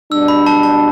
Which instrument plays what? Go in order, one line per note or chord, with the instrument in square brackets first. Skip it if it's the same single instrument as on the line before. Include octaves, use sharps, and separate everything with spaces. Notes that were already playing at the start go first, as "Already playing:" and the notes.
[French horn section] B2 G3 D4 [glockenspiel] E6
[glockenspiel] B5
A5
A5